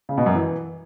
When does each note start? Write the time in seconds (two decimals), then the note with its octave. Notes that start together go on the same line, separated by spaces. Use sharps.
0.09 C#3
0.18 B2
0.26 F#2
0.35 E3